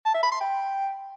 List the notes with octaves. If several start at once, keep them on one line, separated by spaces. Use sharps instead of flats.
A5
E5
B5
C6
G5